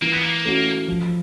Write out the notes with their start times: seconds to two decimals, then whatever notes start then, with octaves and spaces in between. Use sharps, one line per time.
0.02 E3 A#3
0.12 B3
0.24 A#3
0.45 A3 C#4 F#4
0.88 F3